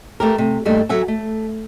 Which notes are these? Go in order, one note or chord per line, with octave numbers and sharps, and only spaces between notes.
A3 G4 A#4
C3
G2 D#3 G3 A3 A#3
F#3 A4 E5 F#5 G#5
A3